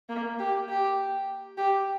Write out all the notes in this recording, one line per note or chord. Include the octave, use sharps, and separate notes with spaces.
A#3
G4
G4
G4